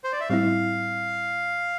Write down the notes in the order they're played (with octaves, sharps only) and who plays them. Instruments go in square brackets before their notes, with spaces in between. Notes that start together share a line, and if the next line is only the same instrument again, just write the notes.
[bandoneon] C5
D5
E5
[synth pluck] A2 G3 C4 E4 [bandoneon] F5